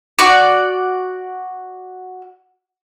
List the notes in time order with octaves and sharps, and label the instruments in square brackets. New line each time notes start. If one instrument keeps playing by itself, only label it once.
[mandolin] F#4 D5